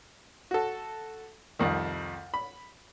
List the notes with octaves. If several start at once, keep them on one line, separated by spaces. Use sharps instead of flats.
F#4 A4
C2 F2 D#3
B5